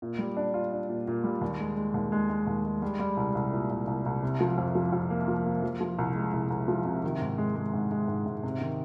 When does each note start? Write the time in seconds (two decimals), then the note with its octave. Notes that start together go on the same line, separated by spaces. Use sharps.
0.02 A#2
0.19 G3
0.37 D4
0.54 F4
0.72 D4
0.89 A#2
1.07 A#2
1.24 G3
1.41 D#2
1.60 G#3
1.77 G#3
1.94 D#2
2.12 G#3
2.29 G#3
2.47 D#2
2.65 G#3
2.82 G3
3.00 G3
3.17 C2
3.35 C2
3.53 A#2
3.71 C2
3.87 C2
4.06 C2
4.23 C3
4.41 F3
4.58 F2
4.75 F3
4.93 F2
5.10 A#3
5.28 F3
5.45 A#3
5.63 F3
5.81 F3
5.98 C2
6.15 G#3
6.33 C2
6.50 C2
6.68 F3
6.85 C3
7.04 D#3
7.21 G#2
7.38 G#3
7.55 G#3
7.73 G#2
7.91 G#3
8.08 G#2
8.26 G#2
8.44 C3
8.61 D#3